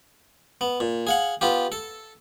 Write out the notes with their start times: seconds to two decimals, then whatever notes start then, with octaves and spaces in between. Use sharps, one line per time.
0.61 B3
0.80 A#2
1.07 G#4 F5 F#5
1.41 B3 F4 G4
1.72 A4